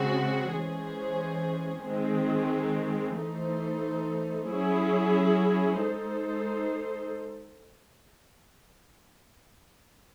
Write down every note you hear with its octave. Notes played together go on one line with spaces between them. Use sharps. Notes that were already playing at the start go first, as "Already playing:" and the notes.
Already playing: C#3 G#3 C4 F#4
E3 G#3 C#4 G#4 C5
D#3 G#3 C4
E3 A3 D#4 A4 C5
F#3 C#4 E4 G#4
G#3 D#4 A4 C5